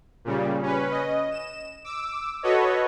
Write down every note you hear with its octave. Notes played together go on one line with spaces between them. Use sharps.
A#2 C#3 G3
C#4 B4
D#5
E7
D6 E6
F#4 A4 B4 C#5 D#5